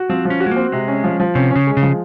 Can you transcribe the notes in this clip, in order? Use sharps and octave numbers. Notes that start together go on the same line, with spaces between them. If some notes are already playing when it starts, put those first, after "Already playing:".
Already playing: F#4
F3 C4
F3
C#4
F#4
G#3
A#3 C4
C3 G#3
C#4
F3
F3
C3 C#4
C#4
C#3
G#3
C#3
F3